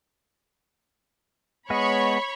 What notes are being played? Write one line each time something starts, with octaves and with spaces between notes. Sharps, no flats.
G#3 B3 C#5 D#5 B5 C#6